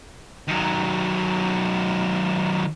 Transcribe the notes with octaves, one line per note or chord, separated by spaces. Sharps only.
D#3 F#3